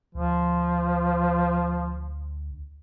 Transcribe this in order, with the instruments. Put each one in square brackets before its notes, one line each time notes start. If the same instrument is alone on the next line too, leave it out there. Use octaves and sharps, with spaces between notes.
[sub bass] D2 [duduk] F3